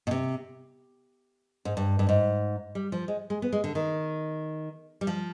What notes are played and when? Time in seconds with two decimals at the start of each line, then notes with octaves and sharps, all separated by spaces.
0.07 B2
0.11 C3
1.65 G#2
1.77 G2
1.99 G2
2.09 G#2
2.75 G3
2.92 F3
3.08 G#3
3.30 G#3
3.42 B3
3.52 G#3
3.64 D3
3.75 D#3
5.01 G3
5.07 F3